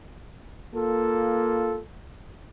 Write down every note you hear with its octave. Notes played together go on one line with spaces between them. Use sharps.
A#3 F4 A4